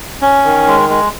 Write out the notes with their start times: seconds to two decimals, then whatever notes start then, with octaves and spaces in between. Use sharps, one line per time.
0.22 C#4
0.44 D#3
0.67 G#3
0.90 G#3